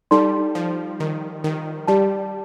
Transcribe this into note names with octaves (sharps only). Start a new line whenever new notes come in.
G3 D#4 A4 D5 A5 C6
F3
D#3
D#3
G3 G4 D5 A5